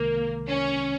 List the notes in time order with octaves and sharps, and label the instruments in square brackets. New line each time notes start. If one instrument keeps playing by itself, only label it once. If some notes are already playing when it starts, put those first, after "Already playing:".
Already playing: [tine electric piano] C2 C3 D#3 G#3 [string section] A#3
[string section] C#4